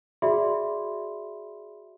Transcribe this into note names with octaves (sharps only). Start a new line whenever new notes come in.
F#4 G#4 D5 E5 B5 C6